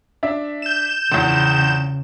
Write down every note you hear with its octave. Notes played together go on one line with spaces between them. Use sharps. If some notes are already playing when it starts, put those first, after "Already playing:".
D4 E5
G6 E7
A#1 E2 C#3